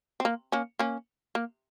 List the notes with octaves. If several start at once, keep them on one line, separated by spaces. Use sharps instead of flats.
C4
A#3
A#3 C#4
A#3 C#4
A#3